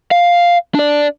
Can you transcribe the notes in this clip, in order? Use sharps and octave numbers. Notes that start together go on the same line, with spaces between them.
F5
D4 D5